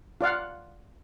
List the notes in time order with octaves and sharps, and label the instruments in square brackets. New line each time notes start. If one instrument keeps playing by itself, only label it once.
[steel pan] F4 D5 F5 F#5